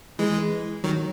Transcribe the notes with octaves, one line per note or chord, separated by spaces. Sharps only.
E3 G#3
D#3 F#3